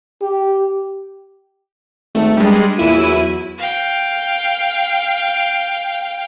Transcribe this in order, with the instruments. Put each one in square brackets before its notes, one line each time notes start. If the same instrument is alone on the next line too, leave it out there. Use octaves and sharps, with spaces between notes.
[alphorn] G4
[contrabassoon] G#1 [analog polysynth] A3
[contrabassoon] G2 [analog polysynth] G3 G#3
[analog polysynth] E2 E4 D#7 [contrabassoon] A#2
[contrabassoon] F#3
[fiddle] F5 G5